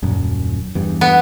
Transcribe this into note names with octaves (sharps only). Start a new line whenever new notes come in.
D#1 F#2
E2 G2
B3